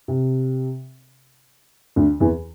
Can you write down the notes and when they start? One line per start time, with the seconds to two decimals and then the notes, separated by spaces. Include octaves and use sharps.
0.08 C3
1.96 D2 D3
2.20 E2 E3